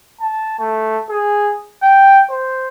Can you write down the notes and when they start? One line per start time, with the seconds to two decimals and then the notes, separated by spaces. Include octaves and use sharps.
0.20 A5
0.60 A3
1.10 G#4
1.83 G5
2.30 C5